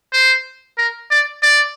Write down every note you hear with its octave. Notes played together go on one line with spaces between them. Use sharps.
C5
A#4
D5
D5